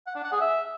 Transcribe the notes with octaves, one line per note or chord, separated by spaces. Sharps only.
F#5
D4
F#5
G#4
E5